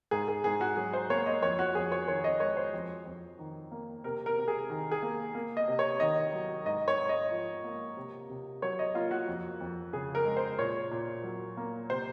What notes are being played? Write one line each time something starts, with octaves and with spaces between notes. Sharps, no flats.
G#2 G#4
G#4
G#2 G#4
F#4
F#3 G#4
C5
A#3 C#5
D#5
F2 C#5
F#4
F2 G#4
C#5
D#3 C#5
D#5
G#3 C#5
C5
F2
F2
D#3
A#3
C3 A#4
A#4
C3
G#4
D#3
G#4
A#3
A#3
D#5
C3
C#5
D#3 D#5
F#3
G#2 D#5
C#5
G#2
D#5
F3
A#3
C3
C3
F#3 C#5
D#5
A#3 F4
F#4
F2
F2
C#3 G#4
A#4
G#3
C5
A#2 C#5
A#2
F#3
A#3
C3 C5